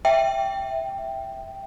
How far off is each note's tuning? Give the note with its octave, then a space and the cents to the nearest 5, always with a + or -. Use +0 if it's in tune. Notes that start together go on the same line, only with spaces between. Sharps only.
E5 +0 G5 +0